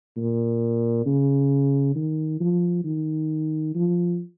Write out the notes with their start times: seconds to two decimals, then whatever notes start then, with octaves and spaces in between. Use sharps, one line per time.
0.17 A#2
1.06 C#3
1.95 D#3
2.40 F3
2.85 D#3
3.75 F3